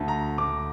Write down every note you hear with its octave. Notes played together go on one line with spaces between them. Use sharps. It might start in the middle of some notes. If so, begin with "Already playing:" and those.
Already playing: D2 D3 A5
A#5
D2 D6